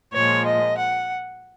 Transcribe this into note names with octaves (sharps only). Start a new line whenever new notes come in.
A#2 F3 G#3 C#5
D#5
F#5